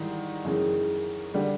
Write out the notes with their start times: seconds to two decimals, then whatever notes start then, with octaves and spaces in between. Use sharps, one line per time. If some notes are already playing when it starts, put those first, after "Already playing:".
Already playing: G#2 D#3 E3 G3 D#4
0.45 F#2 C#3 E3 G#3
1.34 D3 G3